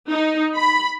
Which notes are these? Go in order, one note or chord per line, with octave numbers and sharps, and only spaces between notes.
D#4
B5